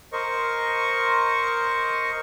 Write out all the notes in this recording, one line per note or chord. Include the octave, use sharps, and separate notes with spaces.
A#4 C5 D#5 C#6